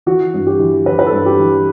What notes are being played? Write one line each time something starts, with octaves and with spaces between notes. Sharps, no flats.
E3 F#4
G2
G4
E3
E3 B4
B4
A4
G2
G4
E3